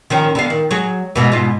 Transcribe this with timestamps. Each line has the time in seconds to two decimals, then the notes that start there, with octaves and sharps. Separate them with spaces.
0.10 D#3 F3 C#4
0.35 D3 B3 F5
0.50 D#3
0.71 F#3 G#4
1.16 G#2 B2 E3
1.32 G#2 B2 F4